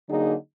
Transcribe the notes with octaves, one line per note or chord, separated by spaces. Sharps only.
D3 F#3 A#3 D#4 G#4